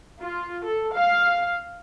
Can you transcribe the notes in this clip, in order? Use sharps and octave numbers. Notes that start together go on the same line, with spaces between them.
F4
A4
F5